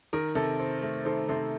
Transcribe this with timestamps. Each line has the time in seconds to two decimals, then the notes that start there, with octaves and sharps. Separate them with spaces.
0.13 D#3 A#4
0.35 C3 A4
0.59 C4
0.82 A3
1.05 D#3 A4 C5
1.29 C3 A4 C5